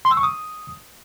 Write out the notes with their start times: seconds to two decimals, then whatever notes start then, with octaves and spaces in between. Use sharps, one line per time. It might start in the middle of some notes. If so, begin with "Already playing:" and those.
0.05 C6
0.11 E6
0.17 C#6
0.23 D#6